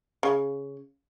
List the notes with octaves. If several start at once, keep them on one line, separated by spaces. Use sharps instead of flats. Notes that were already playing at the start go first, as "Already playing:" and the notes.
C#3